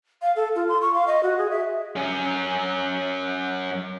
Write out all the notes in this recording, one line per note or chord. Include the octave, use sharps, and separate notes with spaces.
F5
A4
F4
C6
C#6
F5
D#5
F#4
G#4
E5
F#2 C#4